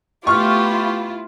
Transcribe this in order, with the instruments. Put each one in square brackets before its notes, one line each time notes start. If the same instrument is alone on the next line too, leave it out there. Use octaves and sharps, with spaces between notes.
[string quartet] A3 B3 G4 [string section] E4 F4 [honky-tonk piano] C#6 F6